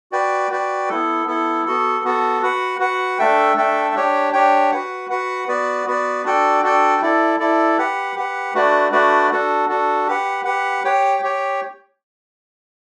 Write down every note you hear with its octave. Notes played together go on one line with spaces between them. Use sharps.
F#4 B4 D5 G5
F#4 B4 D5 G5
B3 E4 A4
B3 E4 A4
B3 F#4 A4
B3 F#4 A4
F#4 B4 F#5
F#4 B4 F#5
A3 D4 A4 E5 G5
A3 D4 A4 E5 G5
D4 G4 C#5 G5
D4 G4 C#5 G5
F#4 B4 F#5
F#4 B4 F#5
B3 F#4 B4 D5
B3 F#4 B4 D5
D4 F#4 A4 D5 G5
D4 F#4 A4 D5 G5
E4 A4 D5
E4 A4 D5
G4 B4 F#5
G4 B4 F#5
A3 D4 F#4 B4 D5
A3 D4 F#4 B4 D5
D4 F#4 A4
D4 F#4 A4
G4 B4 F#5
G4 B4 F#5
G4 C#5 G5
G4 C#5 G5